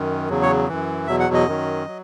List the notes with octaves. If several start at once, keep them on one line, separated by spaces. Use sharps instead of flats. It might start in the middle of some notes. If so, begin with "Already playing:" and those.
Already playing: F#2 D#3
E2 C#3 F#3
C#5
F#2 E3
E2 B2 F#3 E5
F#5
D#5
F#2 D#3 F#3
F#3